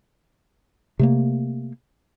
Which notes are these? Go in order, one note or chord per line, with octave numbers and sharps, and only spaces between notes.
C3 A3 A#3